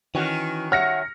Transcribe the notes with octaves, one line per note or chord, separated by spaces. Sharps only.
D#3 E3 C#4 F#4
C#5 E5 F#5 F6 A#6 C#7